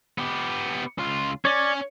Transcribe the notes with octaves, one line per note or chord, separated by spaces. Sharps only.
B3 G4
C#2 F4
C#4 C#5 D5